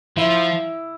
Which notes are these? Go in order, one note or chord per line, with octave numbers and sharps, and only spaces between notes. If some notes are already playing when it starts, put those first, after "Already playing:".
F3 E4